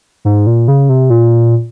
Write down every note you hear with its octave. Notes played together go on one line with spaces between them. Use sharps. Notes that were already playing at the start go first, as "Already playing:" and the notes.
G#2
A#2
C#3
C3
A#2